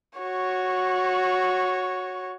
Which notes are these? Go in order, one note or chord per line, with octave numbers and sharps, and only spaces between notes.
F#4 C#5